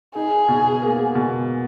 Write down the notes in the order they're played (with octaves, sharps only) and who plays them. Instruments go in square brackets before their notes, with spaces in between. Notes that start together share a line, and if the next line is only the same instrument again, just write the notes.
[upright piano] D#4 [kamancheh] G#4
[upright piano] B2
A#3
B2